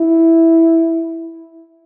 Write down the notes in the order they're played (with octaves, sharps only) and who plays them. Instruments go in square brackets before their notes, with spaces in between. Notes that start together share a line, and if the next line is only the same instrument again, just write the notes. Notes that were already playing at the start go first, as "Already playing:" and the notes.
Already playing: [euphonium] E4